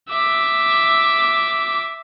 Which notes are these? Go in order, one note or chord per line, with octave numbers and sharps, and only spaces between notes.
E5 D6